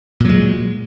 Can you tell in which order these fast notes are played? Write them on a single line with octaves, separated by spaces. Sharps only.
A#2 F#3 G#3